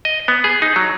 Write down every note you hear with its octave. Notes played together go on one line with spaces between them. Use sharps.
D#5
B3
G#4
D#4
F#3